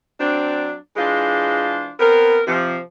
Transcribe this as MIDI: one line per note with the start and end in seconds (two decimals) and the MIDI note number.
0.20 0.76 54
0.20 0.76 60
0.20 0.76 62
0.97 1.91 52
0.97 1.91 56
0.97 1.91 62
0.97 1.91 65
0.97 1.91 72
2.00 2.40 59
2.00 2.40 60
2.00 2.40 70
2.48 2.78 48
2.48 2.78 53